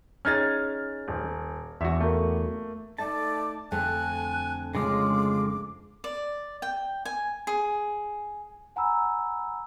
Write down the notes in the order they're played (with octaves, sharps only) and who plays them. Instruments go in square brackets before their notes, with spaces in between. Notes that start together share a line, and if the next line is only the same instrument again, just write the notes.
[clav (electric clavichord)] C#4 D#4 G#4 [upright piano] F6 G#6 A6
[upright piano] D#1
[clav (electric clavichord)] E2 F#4 [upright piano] E5
[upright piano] A3 A#3
[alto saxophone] A3 [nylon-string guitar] D#4 [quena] D5 [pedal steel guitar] A5
[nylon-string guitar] F2 D3 A3 [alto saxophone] G#5 [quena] F#6
[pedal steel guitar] C#3 G#3 F4 [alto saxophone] C#4 [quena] D6
[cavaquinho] D5
G5
G#5
G#4
[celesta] F#5 G#5 A#5 B5 E6